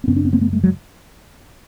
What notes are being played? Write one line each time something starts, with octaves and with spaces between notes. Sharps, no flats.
C4
F#2 C#3 B3 C#4
C4 D4
B3 C#4
A#3 C4
A3 B3
G3 A3
F#3 G#3